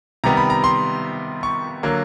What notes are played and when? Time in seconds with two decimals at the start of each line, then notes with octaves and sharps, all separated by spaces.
0.24 C3 D#3 G3 B3 A#5
0.37 B5
0.50 A#5
0.64 C6
1.43 C#6
1.83 D3 F#3 A#3